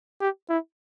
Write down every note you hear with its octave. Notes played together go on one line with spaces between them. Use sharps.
G4
E4